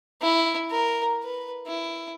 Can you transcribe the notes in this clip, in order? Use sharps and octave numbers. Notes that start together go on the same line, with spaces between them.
E4
A#4
B4
E4